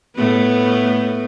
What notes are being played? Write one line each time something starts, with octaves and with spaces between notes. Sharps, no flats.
A2 A3 B3